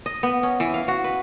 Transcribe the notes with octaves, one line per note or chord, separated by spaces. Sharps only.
D#5
B3
C#4
E3
F5
F#4
B4